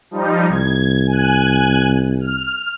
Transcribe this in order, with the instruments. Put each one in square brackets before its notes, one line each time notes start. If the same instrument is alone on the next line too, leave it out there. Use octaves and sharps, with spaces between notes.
[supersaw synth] F3 G3 D#4
[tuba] C2 [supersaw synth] G#6
[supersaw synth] G#5 F#6
F6